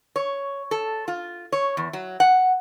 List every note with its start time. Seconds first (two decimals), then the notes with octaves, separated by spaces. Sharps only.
0.16 C#5
0.71 A4
1.08 F4
1.52 C#5
1.77 E2
1.93 F#3
2.20 F#5